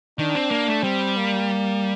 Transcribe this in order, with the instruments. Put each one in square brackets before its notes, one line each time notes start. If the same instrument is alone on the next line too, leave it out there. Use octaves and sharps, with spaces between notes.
[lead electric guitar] D#3 [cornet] D4
[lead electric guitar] C4
A#3
A3
[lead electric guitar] G3 [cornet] C4
[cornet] A#3